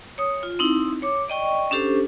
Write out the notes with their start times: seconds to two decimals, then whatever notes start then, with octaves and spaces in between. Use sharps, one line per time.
0.18 C#5 D#6
0.43 F4
0.59 C4 D#4 E4
1.02 C#5 D6
1.28 D5 D#5 G5 C#6
1.71 C#4 D4 G4 A4 C5